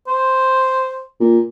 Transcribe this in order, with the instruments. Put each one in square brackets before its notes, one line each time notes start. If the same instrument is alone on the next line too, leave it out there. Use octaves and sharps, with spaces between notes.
[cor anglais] C5
[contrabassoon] A#2